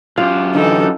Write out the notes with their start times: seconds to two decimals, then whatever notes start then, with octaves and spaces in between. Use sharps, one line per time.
0.18 F#2 F4 G4
0.55 D3 E3 D#4 A4